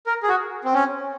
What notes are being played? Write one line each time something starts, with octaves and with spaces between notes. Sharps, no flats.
A#4
G#4
F#4
C4
C#4